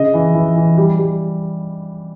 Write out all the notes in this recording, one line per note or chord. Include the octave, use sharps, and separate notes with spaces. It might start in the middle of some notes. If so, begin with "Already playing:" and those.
Already playing: C#3 D#5
E3
E3
E3
G3
G3